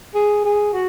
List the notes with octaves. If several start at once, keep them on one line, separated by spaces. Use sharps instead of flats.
G#4
G#4
F#4